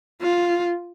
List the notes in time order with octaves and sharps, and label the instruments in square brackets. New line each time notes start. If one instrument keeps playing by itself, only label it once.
[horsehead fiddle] F4